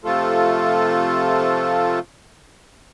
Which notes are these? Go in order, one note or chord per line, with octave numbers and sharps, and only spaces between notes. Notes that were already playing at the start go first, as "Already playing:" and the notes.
C3 F3 A3 F4 A4